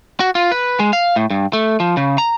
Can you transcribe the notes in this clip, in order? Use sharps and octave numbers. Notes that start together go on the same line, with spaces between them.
F#4
F4
B4
G#3
F5
A2
G2
A3
F3
C#3
A#5